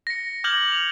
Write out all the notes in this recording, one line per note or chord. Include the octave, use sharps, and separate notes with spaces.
A#6 C#7
D6 F6 G6 G#6 A#6 F#7
F7